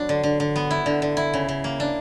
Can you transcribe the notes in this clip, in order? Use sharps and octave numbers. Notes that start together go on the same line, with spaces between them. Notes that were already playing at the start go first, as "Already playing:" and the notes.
Already playing: F#3 B3 D4
D3
D3
D3
B3
E4
D3
D3
E4
C#3
C#3
A#3
D4